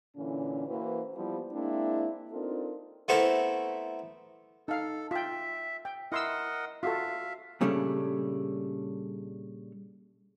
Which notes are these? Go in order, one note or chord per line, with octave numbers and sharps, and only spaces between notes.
A#2 D3 E3 C#4
E3 A#3 F#4 B4 C5
F3 G3 B3 E4 F4
G#3 A#3 C4 D4 E4
C4 D4 D#4 F4 A4 A#4
A3 B3 C4 E4 A4 A#4
D#4 A4 F5
F4 E5 G5
G5
E4 A#4 D#5 F#5 C6 E6
F4 F#4 A4 E5 F5
A#2 C#3 G3 A3 C#4 D4